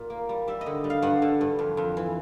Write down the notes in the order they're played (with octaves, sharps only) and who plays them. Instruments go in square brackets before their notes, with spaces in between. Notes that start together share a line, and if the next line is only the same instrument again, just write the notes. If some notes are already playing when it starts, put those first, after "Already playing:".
Already playing: [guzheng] A#2
A#3
G3
G3 E5
D#5
D3
G3
F5
G2 F#5
D3
G2
F2
F2
E3